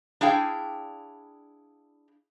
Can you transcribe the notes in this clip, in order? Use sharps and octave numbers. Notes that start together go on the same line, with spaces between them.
D4 E4 G#4 F5 G5